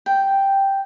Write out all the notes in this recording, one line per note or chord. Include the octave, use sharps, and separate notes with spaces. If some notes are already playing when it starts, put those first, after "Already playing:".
G5